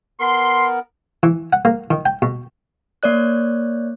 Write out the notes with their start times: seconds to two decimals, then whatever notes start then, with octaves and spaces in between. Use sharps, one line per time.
0.20 B3 A#4 C6
1.23 E3
1.53 F#5
1.65 A#3
1.91 D#3
2.06 G5
2.22 B2
3.03 A#3 C#5 D5 F#6